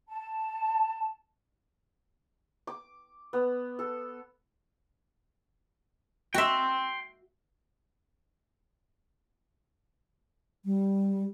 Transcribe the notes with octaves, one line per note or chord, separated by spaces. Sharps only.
A5
D6
B3
A4
F#4 E5 G5 C6
G3